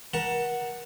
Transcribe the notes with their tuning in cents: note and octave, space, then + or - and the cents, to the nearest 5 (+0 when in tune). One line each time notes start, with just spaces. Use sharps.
A#4 +35 F#5 +0 A5 +15